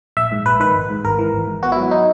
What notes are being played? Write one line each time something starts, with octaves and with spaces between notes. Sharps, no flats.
A#1 E5
G#2
A#1 B4
D#3 B4
G#1
G#2
G#1 A#4
E3
G#1
G#2
B3 F#4
E4
F#3
E4
D#4